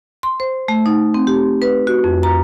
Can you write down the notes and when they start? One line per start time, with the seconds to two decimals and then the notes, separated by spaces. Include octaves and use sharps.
0.23 C6
0.40 C5
0.68 A3
0.86 D#4
1.14 C4
1.27 G4
1.62 B4
1.87 F#4
2.04 F2
2.23 A#5